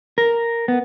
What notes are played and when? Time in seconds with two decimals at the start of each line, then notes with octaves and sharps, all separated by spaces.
0.18 A#4
0.68 B3